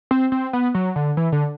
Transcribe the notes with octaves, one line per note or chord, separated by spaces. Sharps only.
C4
C4
B3
F#3
D3
E3
D3